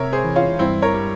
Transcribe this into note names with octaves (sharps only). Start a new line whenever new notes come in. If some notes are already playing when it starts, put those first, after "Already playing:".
Already playing: C3 A#4 C#5 E5
G#4 C5
E3
C#4 F4
G2 C4 E4
A#4 C#5
G3